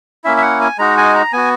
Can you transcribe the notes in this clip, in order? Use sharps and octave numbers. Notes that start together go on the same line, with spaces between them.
A#3 C#4 E4 E5
E5
F#5
G#5
G#3 D#4 F#4 A#5
G#5
A#5
B3 F#4 G#5